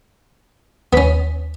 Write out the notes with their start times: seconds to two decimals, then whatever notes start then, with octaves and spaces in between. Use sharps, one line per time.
0.93 D#2 B3 C#4 B6